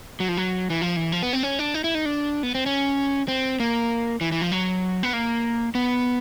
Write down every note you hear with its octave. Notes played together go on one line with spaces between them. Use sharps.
F#3
F3
F#3
E3
F3
E3
F3
B3
C4
C#4
D4
D#4
E4
D#4
D4
B3
C4
C#4
C4
A#3
E3
E3
F3
F#3
B3
A#3
B3